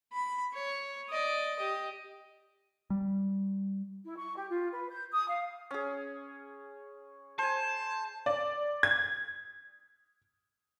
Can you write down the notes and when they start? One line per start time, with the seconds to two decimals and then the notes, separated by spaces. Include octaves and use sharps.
0.13 B5
0.54 C#5
1.09 D5 D#5
1.56 G4 D#5
2.90 G3
4.04 E4
4.18 C#6
4.36 G4
4.49 F4
4.72 B4
4.89 G6
5.12 D#6
5.28 F5
5.71 C#4 G#4
7.39 C5 G#5 A5
8.26 D5
8.83 G#6